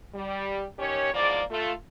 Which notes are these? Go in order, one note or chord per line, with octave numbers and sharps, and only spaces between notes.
G3
D#3 C#4 G4 C#5
E2 G#2 F3 A#3 D5
A3 F4 A4